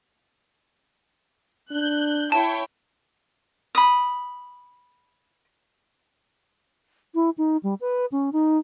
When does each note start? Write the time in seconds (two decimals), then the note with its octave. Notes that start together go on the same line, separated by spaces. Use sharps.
1.71 D4 F#6 G6
2.32 E4 C#5 G5 A5
3.75 B5 D#6
7.15 E4
7.38 D#4
7.63 G3
7.81 B4
8.12 C#4
8.33 D#4